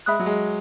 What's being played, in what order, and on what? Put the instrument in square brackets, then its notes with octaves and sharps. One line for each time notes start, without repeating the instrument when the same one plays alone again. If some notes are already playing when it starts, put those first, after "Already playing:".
[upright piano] G#3 [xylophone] E5 B5 D#6 F#6
[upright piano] F#3
G#3